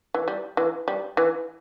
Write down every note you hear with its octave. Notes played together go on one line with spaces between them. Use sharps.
E3
G3
E3
G3
E3